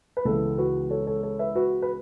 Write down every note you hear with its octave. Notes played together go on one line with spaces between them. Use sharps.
B4
C#2 C#3 E3 B3 E4 A4
F#4 B4
A4 C#5
A4 C#5
A4 C#5
B4 E5
F#4 B4
B4